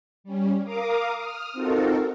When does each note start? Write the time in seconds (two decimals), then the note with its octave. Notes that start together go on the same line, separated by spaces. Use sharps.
0.24 G3 C#4
0.64 A#4 F5 A#5 D6 D#6
1.16 D#6 F6
1.53 C4 D#4 F4 F#4 A4 A#4